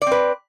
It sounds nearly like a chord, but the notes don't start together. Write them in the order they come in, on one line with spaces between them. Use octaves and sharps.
D5 C4 B4